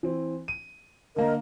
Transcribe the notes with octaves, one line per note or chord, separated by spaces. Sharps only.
E3 C4
D#7
D3 A#3 A#4 D#5